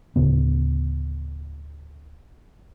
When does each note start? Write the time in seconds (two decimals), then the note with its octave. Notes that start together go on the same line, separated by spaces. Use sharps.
0.16 D1 G1 C#3 B3